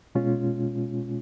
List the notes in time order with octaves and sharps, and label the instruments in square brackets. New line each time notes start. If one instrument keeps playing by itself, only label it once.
[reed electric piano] B2 G#3 C#4 F4